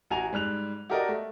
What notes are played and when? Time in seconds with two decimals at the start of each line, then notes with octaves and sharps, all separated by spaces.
0.11 A1 F#4 G#5 A#5 F7
0.33 G#2 G3 F#6 F7
0.90 F#4 G4 A4 A#4 D5 D#5
1.08 A3